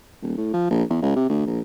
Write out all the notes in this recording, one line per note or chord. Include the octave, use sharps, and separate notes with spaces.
D#1
A2
F3
A#1
E2
C#2
C3
D2
A#1